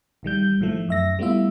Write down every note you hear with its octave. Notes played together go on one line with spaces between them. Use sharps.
A1 D#3 G3 G6
A2 D#3 F3 A3
F#2 E5 A#6
G3 A3 B3 E4 F4 E5